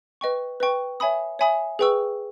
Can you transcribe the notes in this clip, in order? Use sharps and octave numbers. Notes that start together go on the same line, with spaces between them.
B4 D#5 G5 C#6
B4 D#5 G5 C#6
C#5 E5 G#5 B5 D#6
C#5 E5 G#5 B5 D#6
G#4 B4 G5 C#6 E6